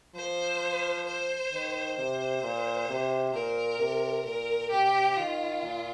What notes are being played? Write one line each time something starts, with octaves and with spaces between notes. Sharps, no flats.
F3 C5
C5
D#3
C3 C5
A#2
C3
A#2 A#4
C3
A#2 A#4
C3 G4
D#3 F4
A#2